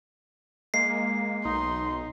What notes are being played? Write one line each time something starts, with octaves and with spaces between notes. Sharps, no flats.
G#3 A#3 C7
B1 D#4 C6